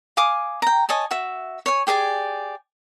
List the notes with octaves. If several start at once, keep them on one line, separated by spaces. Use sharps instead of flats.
F5 G#5 D6 D#6
G5 A#5
C#5 D#5 G#5 A5
F#4 E5
C#5 G#5
G4 G#4 D5 G#5